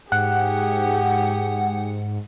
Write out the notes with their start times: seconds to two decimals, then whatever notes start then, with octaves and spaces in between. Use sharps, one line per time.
0.12 G#2 G4 G#4 F#5